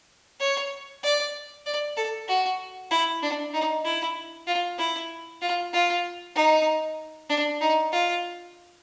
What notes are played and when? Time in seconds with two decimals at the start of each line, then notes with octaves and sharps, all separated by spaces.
0.40 C#5
1.03 D5
1.66 D5
1.97 A4
2.28 F#4
2.91 E4
3.22 D4
3.53 D#4
3.85 E4
4.47 F4
4.79 E4
5.41 F4
5.73 F4
6.35 D#4
7.29 D4
7.61 D#4
7.92 F4